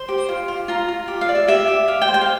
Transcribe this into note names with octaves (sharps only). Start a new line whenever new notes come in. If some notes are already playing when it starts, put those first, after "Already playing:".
Already playing: C5 C6
G4
F4
F4
F4 A#5
F4
G4
F5
D5
E5
G4 E5
G4
G4 F5
G5
C5
G5
F5